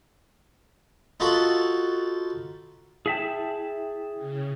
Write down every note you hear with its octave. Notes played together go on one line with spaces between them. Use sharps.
D#4 F4 F#4 A4 B5
E4 G#4 E5 G5 A5
C#3